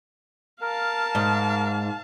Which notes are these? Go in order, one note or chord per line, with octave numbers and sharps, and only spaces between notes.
A#4 F5 A5
G#2